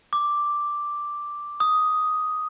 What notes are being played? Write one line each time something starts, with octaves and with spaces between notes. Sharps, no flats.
D6
D#6